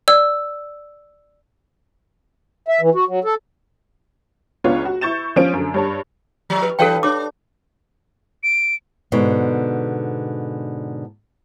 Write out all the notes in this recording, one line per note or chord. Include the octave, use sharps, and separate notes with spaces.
D5 E6
E5
E3
F#4
F#3
A4
C#2 B3 D4 F4 C#5
F#4
E4 C#6 G6 A6 E7
F3 C#4 C5 D7
F#2 D3
G2 C#5 A5
F3
B4
G2 E3 A4 B4 F5 G5
D4 C#5 D6
D7
G#2 B2 D3